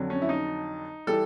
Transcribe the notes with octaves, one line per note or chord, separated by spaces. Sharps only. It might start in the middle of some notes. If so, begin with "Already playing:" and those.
Already playing: F2 D3 F#3
C#4
E4
D#4
E3 G3 A4